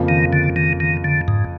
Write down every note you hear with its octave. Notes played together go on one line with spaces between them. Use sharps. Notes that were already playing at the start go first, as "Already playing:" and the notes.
Already playing: F2 C#3 F3 A#3
D#3
D3
D#3
D#3
D3
G#2